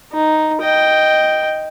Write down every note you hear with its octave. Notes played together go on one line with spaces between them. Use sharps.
D#4
D#5 G5